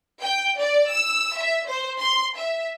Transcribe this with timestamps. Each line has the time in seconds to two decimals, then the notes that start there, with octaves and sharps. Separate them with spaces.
0.21 G5
0.57 D5
0.90 E6
1.35 E5
1.67 C5
1.99 C6
2.37 E5